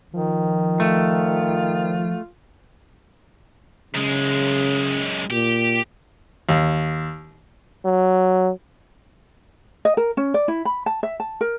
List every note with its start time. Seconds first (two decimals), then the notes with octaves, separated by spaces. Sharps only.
0.13 D#3 F3
0.80 A3 F4
3.95 F#2 C#3 G#3
5.30 A#2 G4
6.49 D#2
7.85 F#3
9.85 D#5
9.97 A#4
10.17 C#4
10.34 D5
10.48 E4
10.65 B5
10.86 A5
11.03 E5
11.20 A5
11.41 A#4